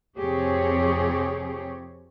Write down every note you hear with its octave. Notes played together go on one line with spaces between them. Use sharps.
F2 C3 C4 G4 G#4 C#5